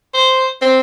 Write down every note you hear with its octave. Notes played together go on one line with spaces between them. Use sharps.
C5
C4